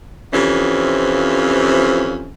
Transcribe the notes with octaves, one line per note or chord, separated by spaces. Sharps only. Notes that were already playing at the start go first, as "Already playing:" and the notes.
F2 C3 E3 F3 C#4